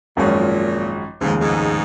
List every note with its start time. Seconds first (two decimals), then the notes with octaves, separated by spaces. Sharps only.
0.17 G#1 F#2 A#2 F3 G#3 C#4
1.21 F1 D#2 G#2 C#3 G#3
1.41 G#2